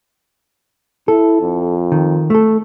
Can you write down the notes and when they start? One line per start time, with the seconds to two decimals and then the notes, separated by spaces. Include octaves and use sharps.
1.08 E4 A4
1.41 F2
1.92 D#3
2.30 A3 A4